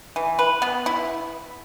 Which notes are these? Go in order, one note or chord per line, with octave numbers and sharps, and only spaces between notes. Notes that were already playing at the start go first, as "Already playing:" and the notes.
E3
B4
B3
E4